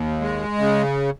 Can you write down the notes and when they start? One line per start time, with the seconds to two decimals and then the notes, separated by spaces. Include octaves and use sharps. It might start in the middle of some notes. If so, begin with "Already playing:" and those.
Already playing: D#2
0.21 G#3
0.58 C#3